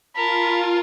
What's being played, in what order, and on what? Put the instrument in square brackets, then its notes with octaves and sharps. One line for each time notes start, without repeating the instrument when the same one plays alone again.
[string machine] F4 [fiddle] A#4 A5 [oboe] B5